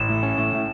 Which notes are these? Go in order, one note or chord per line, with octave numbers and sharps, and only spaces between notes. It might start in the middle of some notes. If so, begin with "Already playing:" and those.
Already playing: A1 E7
A2
C#4
A2
A2